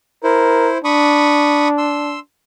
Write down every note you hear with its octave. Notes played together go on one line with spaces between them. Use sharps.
E4 A#4 C5
D4 B5 C#6 D#6
C6 E6